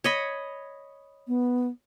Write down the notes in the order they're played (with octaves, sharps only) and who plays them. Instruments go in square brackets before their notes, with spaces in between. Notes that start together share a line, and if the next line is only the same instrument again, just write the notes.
[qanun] C#5 D#5 B5
[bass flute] B3